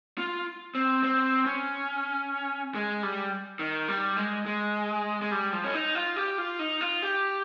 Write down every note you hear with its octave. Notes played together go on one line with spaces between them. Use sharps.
F4
C4
C4
C#4
G#3
G3
D#3
G3
G#3
G#3
G#3
G3
F3
C#4
D#4
F4
G4
F4
D#4
F4
G4